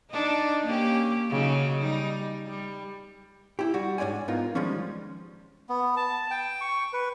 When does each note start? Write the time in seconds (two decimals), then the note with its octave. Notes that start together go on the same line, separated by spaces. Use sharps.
0.10 D4 D#4
0.66 A#3 C#4 G4
1.29 C#3 F#3 D#4
1.79 G3 D#4
2.47 G3
3.59 E4 G4
3.74 G3 F#4
3.98 G#2 D4 C#5 D5 G#5
4.28 B3 D#4 F4 A#4
4.55 D#3 F3 G3 G#3 C#4
5.69 B3
5.97 A5
6.31 G5
6.61 C#6
6.93 B4